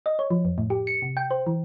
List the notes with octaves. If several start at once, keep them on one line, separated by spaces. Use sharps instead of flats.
D#5
C#5
F3
F2
A2
G4
C#7
C3
G5
C5
E3